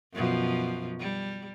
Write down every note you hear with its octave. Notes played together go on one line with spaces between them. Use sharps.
F#2 B2 F3
G3